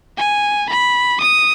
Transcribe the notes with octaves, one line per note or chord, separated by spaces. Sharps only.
G#5
B5
D#6